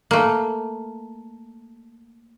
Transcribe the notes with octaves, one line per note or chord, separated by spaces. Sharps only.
A3 A#3